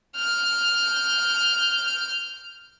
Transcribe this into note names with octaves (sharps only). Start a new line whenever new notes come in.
F6 G6